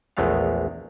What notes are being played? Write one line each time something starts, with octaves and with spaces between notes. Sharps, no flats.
A#1 E2 G#3 A3 B3 F5